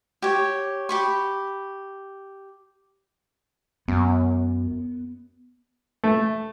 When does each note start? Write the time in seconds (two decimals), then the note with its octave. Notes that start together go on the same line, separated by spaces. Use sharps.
0.22 G4 C#5
0.89 G4 B5 C#6
3.88 F#2 B3
6.04 A3